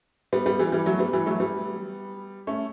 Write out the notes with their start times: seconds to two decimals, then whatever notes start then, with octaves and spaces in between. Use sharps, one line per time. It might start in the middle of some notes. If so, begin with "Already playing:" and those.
0.33 G3 B3
0.46 G3 B3
0.59 E3 G3
0.72 E3 G3
0.86 F#3 A3
0.99 G3 B3
1.13 E3 G3
1.26 F#3 A3
1.40 G3 B3
2.47 A3 C#4